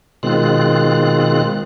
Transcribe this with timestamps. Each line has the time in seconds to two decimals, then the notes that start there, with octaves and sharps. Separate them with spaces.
0.23 B2 D#3 G#3 C4 F4 F#6